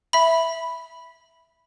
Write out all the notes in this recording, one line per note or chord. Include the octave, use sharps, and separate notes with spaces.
E5 B5